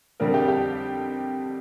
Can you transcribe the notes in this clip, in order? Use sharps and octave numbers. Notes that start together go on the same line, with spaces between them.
F2 D3 G3 A#4
G4
G4